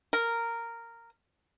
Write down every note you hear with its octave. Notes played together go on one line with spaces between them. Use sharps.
A#4